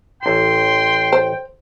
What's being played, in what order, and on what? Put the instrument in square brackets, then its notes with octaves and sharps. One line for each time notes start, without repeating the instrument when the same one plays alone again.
[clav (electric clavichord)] A1 A5 [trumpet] G5 [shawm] C6
[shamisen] C5